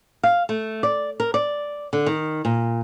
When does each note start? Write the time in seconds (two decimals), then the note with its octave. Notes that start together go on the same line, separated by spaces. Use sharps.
0.23 F5
0.49 A3
0.83 D5
1.20 A#4
1.34 D5
1.93 D3
2.06 D#3
2.45 A#2